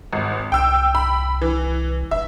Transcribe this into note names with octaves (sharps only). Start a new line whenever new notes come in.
G#1
C2 G5 E6
B5
E3
F1 E5